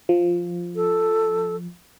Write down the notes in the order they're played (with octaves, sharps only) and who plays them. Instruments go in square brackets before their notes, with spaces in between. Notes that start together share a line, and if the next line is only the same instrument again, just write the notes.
[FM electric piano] F3
[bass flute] A4